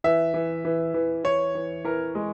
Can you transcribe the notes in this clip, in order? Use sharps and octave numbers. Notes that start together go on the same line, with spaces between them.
E3 E5
E3
E3
E3
E3 C#5
E3
E3 A#4
G#3